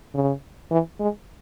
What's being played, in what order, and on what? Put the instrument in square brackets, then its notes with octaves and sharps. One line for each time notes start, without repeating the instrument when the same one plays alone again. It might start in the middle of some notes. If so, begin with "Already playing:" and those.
[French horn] C#3
E3
G#3